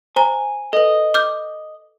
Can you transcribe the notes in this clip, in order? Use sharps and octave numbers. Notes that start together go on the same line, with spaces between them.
C5 G#5 A#5
A4 B4 D#5
D6 F6 G6